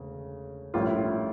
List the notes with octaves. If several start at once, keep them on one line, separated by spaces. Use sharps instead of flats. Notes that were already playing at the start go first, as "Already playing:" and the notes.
Already playing: E1 D2 C#3
A#1 A2 G3 C#4 F4
E4
F4